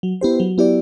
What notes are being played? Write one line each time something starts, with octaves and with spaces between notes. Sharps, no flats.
F#3
B3 E4 G4 C5
F#3
B3 E4 G4 D5